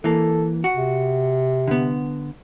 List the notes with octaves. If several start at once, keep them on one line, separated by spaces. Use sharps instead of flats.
E3 A#3 A4
F#4
C3
D3 B3